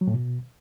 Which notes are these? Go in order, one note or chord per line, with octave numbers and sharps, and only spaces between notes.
F#3
A2
B2